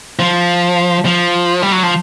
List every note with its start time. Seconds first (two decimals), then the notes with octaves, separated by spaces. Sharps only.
0.19 F3
1.05 F3
1.62 G3
1.72 F#3
1.83 F3